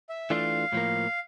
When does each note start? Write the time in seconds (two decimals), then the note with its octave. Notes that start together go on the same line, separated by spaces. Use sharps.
0.09 E5
0.30 E3 A3 D4 F4 F5
0.73 A2 F3 A#3